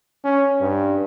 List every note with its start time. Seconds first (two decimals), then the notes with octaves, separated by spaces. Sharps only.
0.24 C#4
0.61 G2